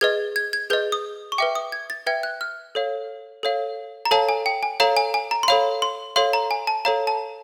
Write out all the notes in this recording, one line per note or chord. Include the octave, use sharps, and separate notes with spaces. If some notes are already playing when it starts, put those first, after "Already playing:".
G#4 B4 D#5 G#6
G#6
G#6
G#4 B4 D#5 G6
D#6
C#6
B4 E5 G5 D6
D#6
G#6
A6
B4 E5 G5 G#6
F#6
F6
A4 C#5 F5
A4 C#5 F5
A#5
A4 C#5 F5 A5
G#5
G5
G#5
A4 C#5 F5 A#5
G#5
G#5
A#5
C6
A4 C#5 F5 B5
C6
A4 C#5 F5 C6
A#5
G#5
A5
A4 C#5 F5 A#5
A5